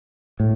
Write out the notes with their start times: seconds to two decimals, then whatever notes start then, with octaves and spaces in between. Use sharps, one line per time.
0.40 A2